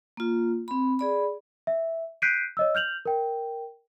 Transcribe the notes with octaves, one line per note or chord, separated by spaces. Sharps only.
A#3 F4
C4 B5
G#4 D5 B5
E5
F#6 G6 B6 C7 D7 D#7
C#5 D#5 E6
F6 G6 F7 F#7
A#4 G5